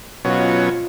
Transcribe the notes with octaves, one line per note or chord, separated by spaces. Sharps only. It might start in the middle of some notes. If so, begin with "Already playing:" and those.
B2 F#3 C#4 F4 C5 D#5